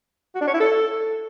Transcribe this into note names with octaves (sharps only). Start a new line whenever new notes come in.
F#4
D4
C#5
E4
A4